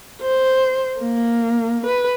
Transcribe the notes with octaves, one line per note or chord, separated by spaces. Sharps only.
C5
A#3
B4